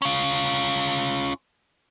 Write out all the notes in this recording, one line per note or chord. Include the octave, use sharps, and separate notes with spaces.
C#4 F4